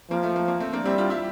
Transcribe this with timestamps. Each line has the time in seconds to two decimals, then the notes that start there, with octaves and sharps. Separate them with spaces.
0.10 F3 A#3
0.23 A3
0.36 A#3
0.48 A#3
0.60 A3 C4
0.73 A#3 D4
0.85 G3 C4 E4
0.98 D4 F4
1.10 E4 G4